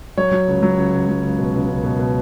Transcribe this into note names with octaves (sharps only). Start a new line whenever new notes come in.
F#3 C#5
F#3
C#2
F#3
C#2
C#2
F#3
C#2
B2
C#2
C#2
B2
B2